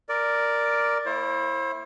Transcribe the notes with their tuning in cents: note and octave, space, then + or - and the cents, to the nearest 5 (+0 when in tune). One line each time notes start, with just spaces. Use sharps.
A#4 +0 D5 +0
A#3 -30 E4 +0 C5 +40